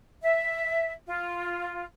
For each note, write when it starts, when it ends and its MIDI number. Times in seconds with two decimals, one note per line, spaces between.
0.22 0.91 76
1.06 1.85 65